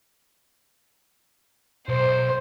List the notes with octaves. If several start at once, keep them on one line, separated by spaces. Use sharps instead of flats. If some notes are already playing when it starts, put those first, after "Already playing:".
B1 C5